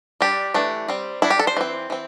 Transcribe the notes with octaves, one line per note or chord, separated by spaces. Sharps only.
G3 D4 G4
E3 A3 D4
G3 C4
G3 D4 E4
G4
A4
C5
E3 C4
E3 C4